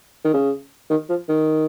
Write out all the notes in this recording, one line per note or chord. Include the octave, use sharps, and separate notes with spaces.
D#3
C#3
D#3
F3
D#3